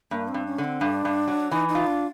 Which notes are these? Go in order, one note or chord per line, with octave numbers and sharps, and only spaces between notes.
G2 A#3
C4
G2
C#4
D3
C4
G2 D4
G2
F#3
E3 D#4
D#4
F4
D4